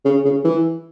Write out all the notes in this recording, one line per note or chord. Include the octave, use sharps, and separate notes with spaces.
C#3
C#3
E3